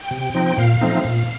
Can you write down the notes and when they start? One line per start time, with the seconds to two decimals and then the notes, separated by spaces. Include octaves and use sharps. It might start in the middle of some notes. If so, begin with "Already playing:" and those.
Already playing: G5
0.11 C3
0.34 F3 C4 D#4
0.57 A#2 F5
0.81 F3 A3 C4 D#4
1.04 A#2